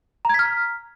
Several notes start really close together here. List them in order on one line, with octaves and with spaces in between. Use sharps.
A#5 G#6 B6 F6